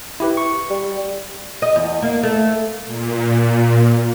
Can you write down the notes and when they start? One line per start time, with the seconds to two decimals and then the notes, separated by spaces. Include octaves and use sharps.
0.20 E4 G4 B4
0.37 C#6
0.70 G3
1.62 D#5
1.76 E2
2.02 A#3
2.23 A3
2.86 A#2